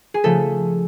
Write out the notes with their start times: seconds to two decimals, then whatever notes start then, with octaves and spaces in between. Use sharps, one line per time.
0.14 G#4
0.24 C#3 F3 A3 A4